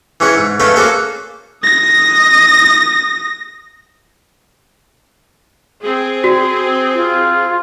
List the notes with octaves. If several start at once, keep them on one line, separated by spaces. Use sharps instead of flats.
E3 C#4 G#4 F#5
G#2
A3 B3 C#4 B4 D#5 F5
A#3 C#4 F#4 G#4 A4 C5
D#6 A#6
C4 G#4
F#4
F4